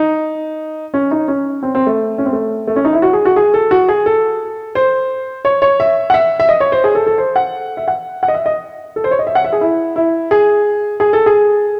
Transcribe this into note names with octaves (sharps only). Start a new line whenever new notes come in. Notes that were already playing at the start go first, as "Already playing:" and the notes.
Already playing: D#4
C#4
D#4
C#4
C4
C4
A3
C#4
C4
A3
A3
C#4
D#4
E4
F#4
G#4
F#4
G#4
A4
F#4
G#4
A4
C5
C#5
C#5
E5
F#5
E5
E5
D#5
C#5
C5
G#4
A4
A4
C5
F#5
E5
F#5
F#5
D#5
E5
D#5
A4
C5
C#5
D#5
E5
F#5
E5
G#4
E4
E4
G#4
G#4
A4
G#4